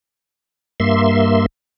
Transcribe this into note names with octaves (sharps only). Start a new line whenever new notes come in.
G2 A#3 E5 C6